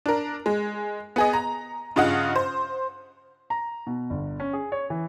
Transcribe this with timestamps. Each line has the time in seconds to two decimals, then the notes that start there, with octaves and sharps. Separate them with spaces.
0.06 D4 A#4
0.46 G#3
1.16 B3 G#4 D#5
1.33 A#5
1.96 G2 C#3 F4 D#5 F5 F#5
2.36 C5
3.50 A#5
3.87 B2
4.10 G1
4.40 C#4
4.53 G#4
4.72 C#5
4.90 E3